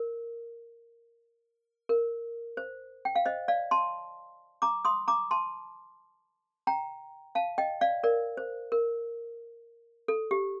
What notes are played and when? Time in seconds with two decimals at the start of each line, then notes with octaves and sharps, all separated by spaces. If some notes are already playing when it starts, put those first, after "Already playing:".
Already playing: A#4
1.89 A#4
2.57 C5
3.05 G5
3.16 F5
3.26 C5 D#5
3.48 D5 F5
3.71 A5 C6
4.62 A#5 D6
4.85 C6 D#6
5.08 A#5 D6
5.31 A5 C6
6.67 G5 A#5
7.35 F5 A5
7.58 D#5 G5
7.81 D5 F5
8.04 A#4 D5
8.37 C5
8.72 A#4
10.08 A4
10.31 G4